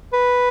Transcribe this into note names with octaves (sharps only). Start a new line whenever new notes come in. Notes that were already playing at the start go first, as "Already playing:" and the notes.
B4